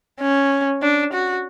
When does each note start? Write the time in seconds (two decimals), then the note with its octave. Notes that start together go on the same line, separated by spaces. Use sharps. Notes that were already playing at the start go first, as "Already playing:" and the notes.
0.21 C#4
0.82 D4
1.13 F#4